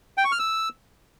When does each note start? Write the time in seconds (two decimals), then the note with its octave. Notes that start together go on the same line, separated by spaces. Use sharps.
0.17 G5
0.25 C#6
0.32 F6
0.39 E6